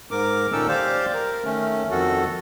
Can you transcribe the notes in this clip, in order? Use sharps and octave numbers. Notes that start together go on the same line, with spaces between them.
G#2 A#4 D6
A#2 D#3 C#4 D#4 A4 E6
G4 C5 D5 F5
A#4
D#3 A3 C#4
F2 D#3 F#4 A4